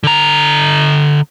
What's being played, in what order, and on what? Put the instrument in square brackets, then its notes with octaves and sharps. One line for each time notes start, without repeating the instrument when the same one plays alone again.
[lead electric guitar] D3 A#5